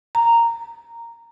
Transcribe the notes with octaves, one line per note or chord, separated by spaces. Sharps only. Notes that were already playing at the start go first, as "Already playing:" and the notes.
A#5